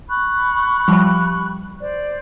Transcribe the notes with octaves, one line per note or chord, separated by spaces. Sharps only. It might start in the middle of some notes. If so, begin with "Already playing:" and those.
B5 C#6 F#6
F3 G3
C5 D5